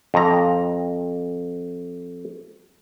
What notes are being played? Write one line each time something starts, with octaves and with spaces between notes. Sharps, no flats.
F2 A#5